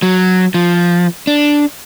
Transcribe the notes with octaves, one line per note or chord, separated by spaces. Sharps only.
F#3
F3
D4